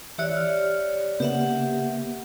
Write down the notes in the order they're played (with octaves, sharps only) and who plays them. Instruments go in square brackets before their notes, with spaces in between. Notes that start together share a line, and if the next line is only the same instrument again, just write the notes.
[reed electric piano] E3 E5 F#6 [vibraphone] G4 C#5 D5
[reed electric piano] F6
[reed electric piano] C#3 A#3 B3 [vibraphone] G4 E5 F#5